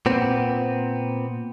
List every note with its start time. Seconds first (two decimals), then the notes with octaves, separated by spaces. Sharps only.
0.06 A#2 B3 C4